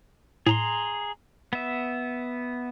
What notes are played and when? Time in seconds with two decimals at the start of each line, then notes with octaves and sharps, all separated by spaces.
0.46 A2 G#4 A#5 C6
1.53 B3 E5